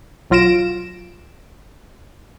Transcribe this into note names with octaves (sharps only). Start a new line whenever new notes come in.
B1 F#3 F4 A#6 D7 E7